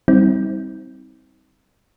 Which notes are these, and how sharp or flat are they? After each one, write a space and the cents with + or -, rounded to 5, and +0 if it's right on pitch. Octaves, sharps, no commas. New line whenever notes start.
G3 +0 C4 +0 D#4 +45